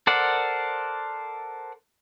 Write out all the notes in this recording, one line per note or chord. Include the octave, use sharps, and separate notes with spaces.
A4 A#4 C5 D5 F#5